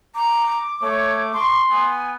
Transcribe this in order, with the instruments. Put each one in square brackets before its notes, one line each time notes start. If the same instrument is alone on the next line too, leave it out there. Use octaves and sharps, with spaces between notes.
[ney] A#5 [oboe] D6
[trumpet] A3 [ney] C#5 [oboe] D6
[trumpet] C6 [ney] C#6
[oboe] B3 [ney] G#5